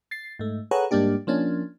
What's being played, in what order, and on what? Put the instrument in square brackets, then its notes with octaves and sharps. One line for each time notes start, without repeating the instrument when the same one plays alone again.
[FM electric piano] A6 C7
G#2 A3
G#4 A4 B4 C#5 F#5 A#5
G#2 G3 A#3 D4 G4
F3 A#3 C#4 D4